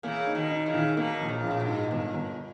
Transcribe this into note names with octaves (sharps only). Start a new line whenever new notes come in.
C#3 E3 A#3
D#4
B2 D#3
D#4
C#3 E3
D#3
B2 D#3 A#3
A#1
C#3
A#1
A#2
B2
G#2
G1 A#2
G1